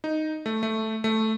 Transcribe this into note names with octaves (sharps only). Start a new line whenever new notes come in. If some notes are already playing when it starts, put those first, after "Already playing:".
D#4
A3
A3
A3